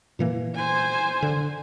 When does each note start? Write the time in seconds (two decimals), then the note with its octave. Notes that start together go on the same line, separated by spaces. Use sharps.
0.19 A#2 E3 A#3
0.56 C5 G#5
1.22 D3